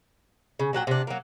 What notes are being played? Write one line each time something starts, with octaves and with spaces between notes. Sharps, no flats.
C#3
A#2 F#3 F#5 G5
C3 D4
F#3 A#3